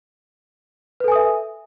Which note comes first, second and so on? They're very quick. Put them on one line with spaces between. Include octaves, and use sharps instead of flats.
B4 A4 G#5 D#6 E5